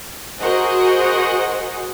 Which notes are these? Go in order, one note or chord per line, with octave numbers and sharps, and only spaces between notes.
F#4 G#4 A#4 C5 D#5 F#5